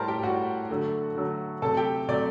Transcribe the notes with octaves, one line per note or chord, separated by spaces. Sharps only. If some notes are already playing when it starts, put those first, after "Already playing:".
Already playing: A2 G3 A#4 C5 A5 A#5
G4 G5
A2 G3 F#4 F#5
D3 F#3 A3
D3 F#3 A3
C3 F#3 A3 A4 A5
G4 G5
C3 F#3 A3 D5